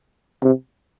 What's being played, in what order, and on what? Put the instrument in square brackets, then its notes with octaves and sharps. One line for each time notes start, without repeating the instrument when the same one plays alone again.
[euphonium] C3